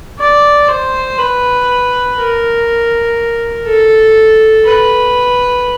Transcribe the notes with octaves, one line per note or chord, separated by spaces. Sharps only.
D5
C5
B4
A#4
A4
B4